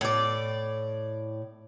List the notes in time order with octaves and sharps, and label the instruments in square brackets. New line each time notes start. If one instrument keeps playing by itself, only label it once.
[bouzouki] A2 D5